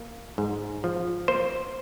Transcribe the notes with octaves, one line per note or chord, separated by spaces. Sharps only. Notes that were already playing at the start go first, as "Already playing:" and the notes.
Already playing: A#3
G#2
F3
A#3 C5